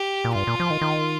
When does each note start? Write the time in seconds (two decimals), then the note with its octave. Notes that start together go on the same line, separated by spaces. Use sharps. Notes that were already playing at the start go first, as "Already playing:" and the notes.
Already playing: G4
0.24 A#2
0.35 G2 F4
0.47 A#2
0.60 F3
0.70 D#3
0.82 D#3